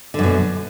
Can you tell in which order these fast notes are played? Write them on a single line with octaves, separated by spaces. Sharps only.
D3 F#2 B2